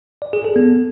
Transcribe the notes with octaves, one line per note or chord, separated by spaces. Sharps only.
D5
G#4
A4
B3